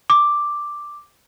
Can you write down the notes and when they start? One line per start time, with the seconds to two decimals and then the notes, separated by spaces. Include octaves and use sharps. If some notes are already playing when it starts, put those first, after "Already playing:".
0.10 D6